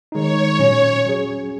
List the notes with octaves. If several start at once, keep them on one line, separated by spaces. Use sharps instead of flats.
D#3 G#3 D#4 C#5
A#2 F#3 C#4
F#3 C#4 G#4